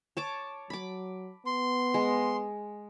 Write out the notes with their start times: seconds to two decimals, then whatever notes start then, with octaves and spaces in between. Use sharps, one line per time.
0.17 C#5 A5 D6
0.70 F#3 B5 D6
1.46 B3 C6
1.94 G#3